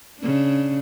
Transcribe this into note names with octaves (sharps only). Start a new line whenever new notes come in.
C#3 D4